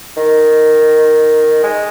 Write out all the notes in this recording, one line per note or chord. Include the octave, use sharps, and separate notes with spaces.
D#3
G#3